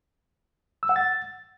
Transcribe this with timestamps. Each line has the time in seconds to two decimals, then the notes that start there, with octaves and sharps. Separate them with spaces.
0.83 E6
0.89 F#5
0.96 A6